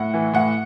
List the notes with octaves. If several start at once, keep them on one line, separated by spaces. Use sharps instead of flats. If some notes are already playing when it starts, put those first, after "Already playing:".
Already playing: A2 F#5
E3
A2 F#5